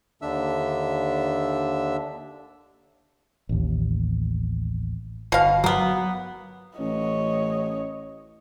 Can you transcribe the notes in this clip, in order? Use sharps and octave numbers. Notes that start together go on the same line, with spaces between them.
D#2 D3 D4 E5 E6
A1 D#2
G1 B2 F5
F#3 A#3 B3
A1 C#5 D#5